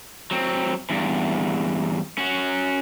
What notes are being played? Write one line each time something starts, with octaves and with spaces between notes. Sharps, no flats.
F#3 C4
E2 G2
C#4 F#4